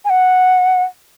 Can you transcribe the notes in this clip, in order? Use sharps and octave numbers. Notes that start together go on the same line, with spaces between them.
G#5
F#5